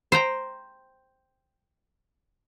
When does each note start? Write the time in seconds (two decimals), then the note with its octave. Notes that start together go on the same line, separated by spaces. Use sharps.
0.12 C5 G5 A#5